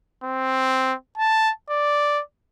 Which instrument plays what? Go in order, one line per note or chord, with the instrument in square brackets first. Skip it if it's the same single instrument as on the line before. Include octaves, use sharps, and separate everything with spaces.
[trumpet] C4
A5
D5